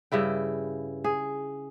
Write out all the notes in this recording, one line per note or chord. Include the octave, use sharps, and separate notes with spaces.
G2 C#3 E4 G5
G#4